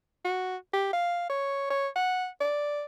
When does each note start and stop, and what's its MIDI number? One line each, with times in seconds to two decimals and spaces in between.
0.25 0.56 66
0.73 0.89 67
0.93 1.27 77
1.29 1.68 73
1.70 1.88 73
1.96 2.28 78
2.40 2.85 74